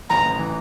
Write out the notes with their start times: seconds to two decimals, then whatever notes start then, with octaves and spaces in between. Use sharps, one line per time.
0.10 A1 A#5
0.25 A1
0.39 E3